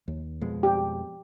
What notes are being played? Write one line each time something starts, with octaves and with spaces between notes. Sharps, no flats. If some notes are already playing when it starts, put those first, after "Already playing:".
D#2
F2 B2 G#3
G4